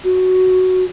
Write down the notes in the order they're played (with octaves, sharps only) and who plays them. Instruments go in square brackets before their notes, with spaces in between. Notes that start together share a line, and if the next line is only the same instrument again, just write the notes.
[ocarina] F#4